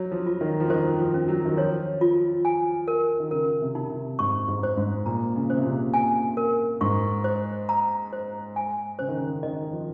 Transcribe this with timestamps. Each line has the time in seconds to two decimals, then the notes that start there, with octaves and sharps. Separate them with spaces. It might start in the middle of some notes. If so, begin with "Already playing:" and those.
Already playing: F#3 C#5
0.11 F3
0.27 F4
0.41 D#3
0.60 F3
0.70 D#3 C5
0.99 F3
1.14 C#4
1.28 F#3
1.45 D#3
1.57 F3 C#5
2.01 F4
2.45 G#5
2.88 A#4
3.20 D#3
3.31 C#3 A#4
3.61 C3
3.75 D#4
3.90 C3
4.19 G#2 C#6
4.48 G#2
4.63 C5
4.77 G#2
5.06 A#2 A#5
5.36 C#3
5.50 C#3 C5
5.57 C3
5.65 A#2
5.94 G#5
6.37 A#4
6.81 G#2 C#6
7.24 C5
7.69 A#5
8.13 C5
8.56 G#5
8.99 C#3 C5
9.08 D#3
9.17 C#3
9.43 D#3 D#5
9.72 F3